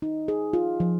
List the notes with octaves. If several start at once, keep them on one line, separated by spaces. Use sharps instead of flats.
D#4
G#4
F4
F3